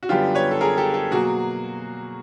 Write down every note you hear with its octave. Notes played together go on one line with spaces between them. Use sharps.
F#4
F#2 D3 G3 B3 F4 G4
B4 C#5
A4
G#4 A#4
G4 A4
G4 A4
B2 F#3 A#3 F#4 G#4